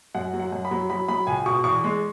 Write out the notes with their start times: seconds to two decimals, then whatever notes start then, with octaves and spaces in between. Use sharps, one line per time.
0.15 F#2 F#5
0.33 F#3
0.40 F#5
0.52 F#2
0.65 B5
0.71 F#3
0.90 F#3 B5
1.08 F#3 B5
1.27 C#2 G#5
1.46 B2 C#6
1.64 E2 C#6
1.84 G#3